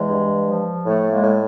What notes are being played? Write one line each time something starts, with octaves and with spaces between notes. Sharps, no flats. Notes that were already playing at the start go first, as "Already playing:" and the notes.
Already playing: E2 E3 G#3
G2
F3
A2 A3
G#3 A#3
A2